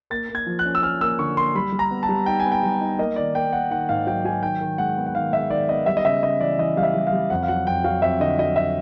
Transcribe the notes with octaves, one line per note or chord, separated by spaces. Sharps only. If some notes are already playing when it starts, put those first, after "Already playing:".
A#3 A6
A#3
G#6
F3
F#6
C#4
E6
C#4 F6
A#3 E6
D3 C#6
A#3 C6
G3 B5
G3
A#5
B3
A5
G3
D#4 G5
G#5
B3
G5
G3
D#4
A#3 D#5
D#3 D5
A#3 G5
A#3 F#5
D#3 F#5
G#2 F5
F#3 G5
F#3 G#5
D#3 G5
D#3
G#3 F#5
B3
F#5
D#3 F5
G#3 E5
D#3 D5
B3 D#5
G3 E5
D#5
C#3 E5
C#3 D#5
E3 D5
E3 D#5
G3 F5
E5
G3
F5
G3
F2 F#5
F5
F#3 F#5
F2 G5
F#3 F5
F2 E5
D3 D#5
F#3 D#5
E5